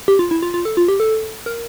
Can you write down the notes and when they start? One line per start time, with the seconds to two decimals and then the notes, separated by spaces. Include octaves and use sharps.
0.08 G4
0.19 F4
0.31 E4
0.42 F4
0.54 F4
0.65 A4
0.77 F4
0.88 G4
1.00 A4
1.46 A#4